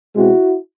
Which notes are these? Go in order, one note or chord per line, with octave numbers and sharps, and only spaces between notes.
B2 G#3 C4 E4 F#4